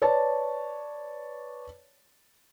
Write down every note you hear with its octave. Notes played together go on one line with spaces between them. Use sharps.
B4 C#5 D5 A5